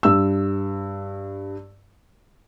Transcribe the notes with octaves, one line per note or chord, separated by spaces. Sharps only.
G2 E6